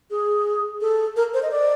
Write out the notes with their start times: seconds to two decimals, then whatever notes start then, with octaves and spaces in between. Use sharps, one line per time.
0.11 G#4
0.81 A4
1.16 A#4
1.34 C5
1.43 D#5
1.51 D5